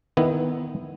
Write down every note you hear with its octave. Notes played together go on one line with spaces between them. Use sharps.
D#3 B3 E4